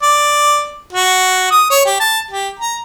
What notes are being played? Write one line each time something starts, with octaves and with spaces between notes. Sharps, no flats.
D5
F#4
D#6
C#5
G4
A5
G4
A#5